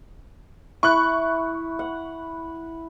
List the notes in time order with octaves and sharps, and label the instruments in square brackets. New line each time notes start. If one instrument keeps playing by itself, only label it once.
[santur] E4 [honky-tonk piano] C#6 F#6
[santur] F#5